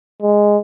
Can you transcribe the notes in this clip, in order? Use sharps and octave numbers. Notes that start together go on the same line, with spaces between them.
G#3